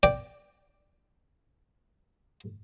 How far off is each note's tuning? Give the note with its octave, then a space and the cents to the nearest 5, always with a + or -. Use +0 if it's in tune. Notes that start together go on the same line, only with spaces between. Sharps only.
D5 +0 G5 +0